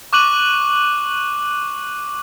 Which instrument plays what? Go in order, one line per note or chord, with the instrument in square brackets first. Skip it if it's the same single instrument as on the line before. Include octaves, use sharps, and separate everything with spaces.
[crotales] C#6 D6 F#6 D#7 F#7